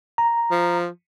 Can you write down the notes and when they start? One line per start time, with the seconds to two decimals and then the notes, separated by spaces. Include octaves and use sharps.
0.18 A#5
0.51 F3